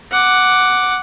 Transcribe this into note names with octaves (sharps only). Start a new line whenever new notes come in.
F#5 D6